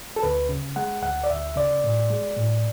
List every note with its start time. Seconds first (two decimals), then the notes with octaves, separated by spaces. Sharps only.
0.16 A4
0.23 D2 B4
0.49 C#3
0.76 G#3 F#5
1.03 D2 F#5
1.24 D5
1.30 D2 E5
1.56 C#3 D5
1.84 A2
2.10 G#3
2.37 A2